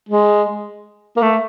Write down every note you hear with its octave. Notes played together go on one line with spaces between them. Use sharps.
G#3
A#3
A3